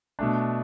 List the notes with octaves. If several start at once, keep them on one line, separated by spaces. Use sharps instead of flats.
B2 A3 D4